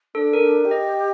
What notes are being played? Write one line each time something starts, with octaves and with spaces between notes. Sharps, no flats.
D4 A4
A#4
D4
G4
D#5